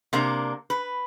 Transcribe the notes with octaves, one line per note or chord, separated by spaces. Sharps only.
C3 A#3 D4
B4